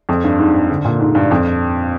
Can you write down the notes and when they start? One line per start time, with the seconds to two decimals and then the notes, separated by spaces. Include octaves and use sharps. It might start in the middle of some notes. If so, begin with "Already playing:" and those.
0.09 F2
0.24 G2
0.39 G#2
0.70 D3
0.85 A#2
0.99 G#2
1.15 G2
1.31 F2